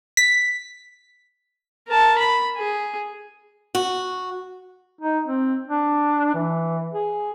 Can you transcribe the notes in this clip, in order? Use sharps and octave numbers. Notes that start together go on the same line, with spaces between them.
B6
A#4 A5
B5
G#4
F#4
D#4
C4
D4
E3
G#4